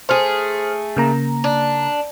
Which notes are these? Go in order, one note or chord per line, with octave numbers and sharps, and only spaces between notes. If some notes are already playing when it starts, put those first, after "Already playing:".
A3 G#4 C5 F6
C#3 A#3 A#5
D4